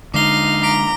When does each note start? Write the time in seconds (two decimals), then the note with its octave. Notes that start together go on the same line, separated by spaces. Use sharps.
0.14 D3 G#3 D#4 F5 D6 G7
0.63 A#5 D6 B6 D7